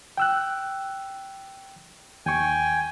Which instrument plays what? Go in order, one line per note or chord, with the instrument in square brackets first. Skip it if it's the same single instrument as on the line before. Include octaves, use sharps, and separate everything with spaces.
[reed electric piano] G5 E6 F#6
[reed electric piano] D#2 C#6 [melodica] G5 G#5